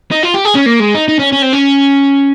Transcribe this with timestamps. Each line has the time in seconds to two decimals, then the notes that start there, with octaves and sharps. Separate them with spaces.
0.11 D#4
0.23 F4
0.34 G4
0.45 G#4
0.55 C#4
0.66 A#3
0.80 G#3
0.95 D#4
1.08 D#4
1.19 C#4
1.32 C#4
1.42 C4
1.53 C#4